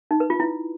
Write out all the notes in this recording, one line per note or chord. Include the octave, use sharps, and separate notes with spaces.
D#4
B4
F4
E4